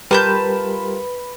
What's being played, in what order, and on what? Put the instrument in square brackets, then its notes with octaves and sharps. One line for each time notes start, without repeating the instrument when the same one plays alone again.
[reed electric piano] G3 G4 A#4 [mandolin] F4 A5 G6 [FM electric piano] B4 B5